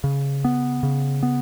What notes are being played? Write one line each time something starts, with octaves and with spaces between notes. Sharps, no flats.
C#3
B3
C#3
B3